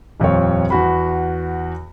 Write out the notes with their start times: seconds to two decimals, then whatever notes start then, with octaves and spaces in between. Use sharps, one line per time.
0.20 D#1 F2 F4 C#5
0.70 E2 F#4 B5